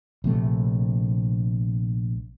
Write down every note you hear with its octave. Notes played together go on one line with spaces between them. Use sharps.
A#1 C3 A3